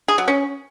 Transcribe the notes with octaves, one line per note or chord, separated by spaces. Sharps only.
G#4
F#3
C#4